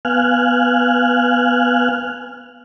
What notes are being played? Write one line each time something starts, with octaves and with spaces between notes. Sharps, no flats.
B3 F5 G#5 F6 F#6